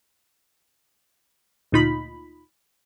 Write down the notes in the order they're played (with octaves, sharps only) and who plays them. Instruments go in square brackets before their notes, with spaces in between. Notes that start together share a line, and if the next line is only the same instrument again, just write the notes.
[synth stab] D2 A#2 D#4 F4 B5